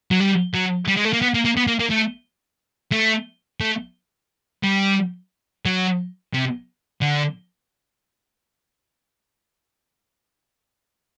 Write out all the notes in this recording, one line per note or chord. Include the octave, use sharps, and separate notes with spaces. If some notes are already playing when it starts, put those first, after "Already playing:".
F#3
G3
F#3
G3
G#3
A3
A#3
B3
A#3
A#3
B3
A#3
A#3
A3
A3
A3
G3
F#3
C3
D3